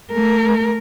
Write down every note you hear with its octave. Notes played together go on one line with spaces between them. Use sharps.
A3 A#4